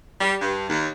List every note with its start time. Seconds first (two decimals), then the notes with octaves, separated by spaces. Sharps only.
0.21 G3
0.41 G2
0.70 D#2